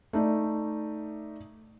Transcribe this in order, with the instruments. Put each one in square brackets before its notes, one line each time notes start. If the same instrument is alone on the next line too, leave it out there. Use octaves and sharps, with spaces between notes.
[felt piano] A3 D#4 D5